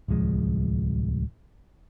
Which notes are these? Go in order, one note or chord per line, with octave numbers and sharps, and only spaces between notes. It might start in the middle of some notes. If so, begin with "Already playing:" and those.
D1 C2 F3 G#3